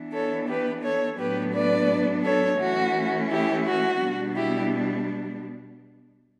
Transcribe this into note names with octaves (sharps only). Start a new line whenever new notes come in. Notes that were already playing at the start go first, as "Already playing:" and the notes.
Already playing: E3 B3 D4
A4 C#5
G4 B4
A4 C#5
A2 F#3 B3 D4 G4 B4
B4 D5
A4 C#5
E3 A3 C#4 F#4
E4 G4
F#4
B2 G3 B3 D4
E4 G4